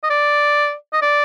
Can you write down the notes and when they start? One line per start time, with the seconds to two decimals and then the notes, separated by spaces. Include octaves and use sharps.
0.03 D#5
0.10 D5
0.93 D#5
1.02 D5